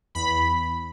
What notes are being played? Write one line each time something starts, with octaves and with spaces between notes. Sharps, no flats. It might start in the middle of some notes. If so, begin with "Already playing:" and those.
E2 B5